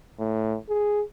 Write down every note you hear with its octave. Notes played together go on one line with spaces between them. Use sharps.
A2
G#4